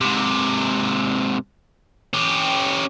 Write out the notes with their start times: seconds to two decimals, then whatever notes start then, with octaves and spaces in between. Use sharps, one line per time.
0.01 G#2 C3
2.13 C#4 G4